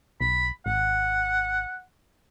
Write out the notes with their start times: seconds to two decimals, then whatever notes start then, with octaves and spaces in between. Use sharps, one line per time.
0.21 B1 B5
0.66 G#1 F#5